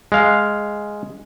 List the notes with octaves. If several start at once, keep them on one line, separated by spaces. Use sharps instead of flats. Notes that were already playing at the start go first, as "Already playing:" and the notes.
G#3 F5